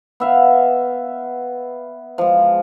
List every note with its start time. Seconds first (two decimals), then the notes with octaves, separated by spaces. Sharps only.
0.20 B3 E5 F5
2.18 F3 G#3